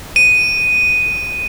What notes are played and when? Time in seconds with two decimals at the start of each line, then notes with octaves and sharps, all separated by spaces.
0.16 D#7